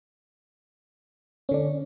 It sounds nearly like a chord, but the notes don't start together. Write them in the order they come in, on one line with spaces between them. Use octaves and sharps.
C#4 D3 D4